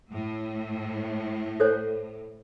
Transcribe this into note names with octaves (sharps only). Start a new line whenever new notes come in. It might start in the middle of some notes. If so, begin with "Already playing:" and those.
A2
A4 C5 C#5